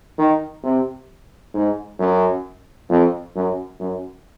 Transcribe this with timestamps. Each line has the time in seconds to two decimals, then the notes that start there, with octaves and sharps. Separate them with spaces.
0.18 D#3
0.63 C3
1.54 G#2
1.99 F#2
2.90 F2
3.35 F#2
3.80 F#2